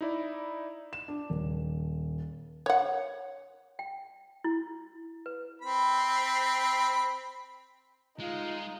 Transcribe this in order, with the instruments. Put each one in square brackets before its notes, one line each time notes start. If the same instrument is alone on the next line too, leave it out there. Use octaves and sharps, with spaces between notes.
[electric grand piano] D#4 E4 D5
[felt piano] E7
D4
D#1
[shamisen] C#5 F#5
[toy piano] G5
E4
B4
[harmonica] C4 B5
[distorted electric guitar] G#3 [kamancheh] D#4 [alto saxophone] F4